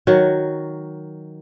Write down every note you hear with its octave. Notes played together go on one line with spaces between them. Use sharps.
D#3 F#3 F#4